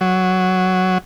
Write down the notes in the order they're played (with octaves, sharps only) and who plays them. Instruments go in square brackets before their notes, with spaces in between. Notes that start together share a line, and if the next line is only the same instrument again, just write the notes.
[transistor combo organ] F#3